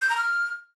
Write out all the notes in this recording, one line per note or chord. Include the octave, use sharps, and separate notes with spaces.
G6
A#5
F6